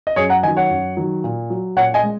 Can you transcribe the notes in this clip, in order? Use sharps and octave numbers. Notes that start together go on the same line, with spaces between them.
D#5
F#2 G#4 C#5
F#5 A#5
D#3 F#3 D#5 G#5
C#5 F#5
F#2
D#3 F#3
A#2
F#3
A#2 C#5 F#5
D#5 G#5
G#3